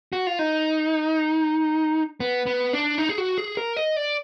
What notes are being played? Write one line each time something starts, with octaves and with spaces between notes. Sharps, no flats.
F#4
F4
D#4
B3
B3
D4
D#4
G#4
F#4
G#4
A#4
D#5
D5